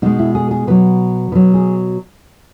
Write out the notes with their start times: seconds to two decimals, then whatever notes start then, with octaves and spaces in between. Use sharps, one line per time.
0.02 B2 G#3 D#4
0.19 E4
0.35 G#4
0.51 G#4
0.67 B2 F#3 B4
1.32 B2 F#3 B4
1.54 G#4